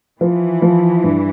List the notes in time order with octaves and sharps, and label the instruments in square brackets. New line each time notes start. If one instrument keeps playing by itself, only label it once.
[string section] E3 [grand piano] F3
[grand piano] F3
G2